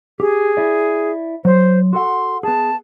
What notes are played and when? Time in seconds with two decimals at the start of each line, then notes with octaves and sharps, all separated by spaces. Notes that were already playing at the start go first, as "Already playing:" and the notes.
0.20 G4 G#4
0.57 E4 D5
1.45 F#3 C5 C6
1.93 F#4 A4 F#5 C6
2.43 B3 G#4 A5